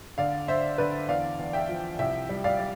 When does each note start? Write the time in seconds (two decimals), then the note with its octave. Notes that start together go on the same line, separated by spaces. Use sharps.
0.18 D3 D5 F5
0.48 D3 C5 E5
0.78 D3 B4 D5
1.08 E2 D5 F5
1.39 E2
1.53 E5 G5
1.69 F3
1.99 C2 E5 G5
2.29 G3
2.44 D5 F5
2.59 G3